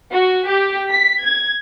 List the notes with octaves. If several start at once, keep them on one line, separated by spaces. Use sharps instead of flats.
F#4
G4
B6
G#6